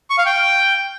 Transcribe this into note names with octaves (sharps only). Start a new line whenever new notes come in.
C#6
F5
G5